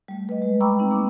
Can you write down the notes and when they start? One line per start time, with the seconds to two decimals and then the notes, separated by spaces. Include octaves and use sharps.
0.08 G3 A3
0.29 B4 D#5
0.42 G#3
0.61 G5 A#5 B5 C#6 D6 E6
0.79 C4 D#4
0.91 A#3 D6